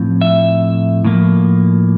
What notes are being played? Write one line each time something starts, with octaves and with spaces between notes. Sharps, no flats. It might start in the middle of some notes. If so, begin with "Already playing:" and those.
Already playing: A2 F3 C4
E5
A2 F3 A#3